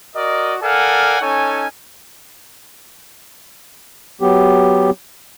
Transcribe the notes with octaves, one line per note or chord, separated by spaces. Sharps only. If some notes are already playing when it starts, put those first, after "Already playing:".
F#4 A#4 D5 D#5
A4 A#4 D5 F5 F#5 G#5
C#4 D#4 A4 C#5 G#5
F#3 B3 G4